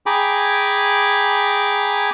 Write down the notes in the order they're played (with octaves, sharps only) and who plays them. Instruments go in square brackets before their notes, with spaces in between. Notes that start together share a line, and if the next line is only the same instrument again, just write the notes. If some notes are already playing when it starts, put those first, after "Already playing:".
[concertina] G#4 G5 G#5 A#5 B5 D6